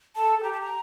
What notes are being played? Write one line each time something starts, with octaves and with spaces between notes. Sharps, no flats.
A4 A5
A4
G4 A#5
A5
A#5